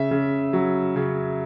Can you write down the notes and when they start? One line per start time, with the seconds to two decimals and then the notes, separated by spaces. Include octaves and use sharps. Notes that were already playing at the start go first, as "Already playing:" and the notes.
Already playing: C#3 E5
0.11 C#3
0.53 F#3
0.96 C#3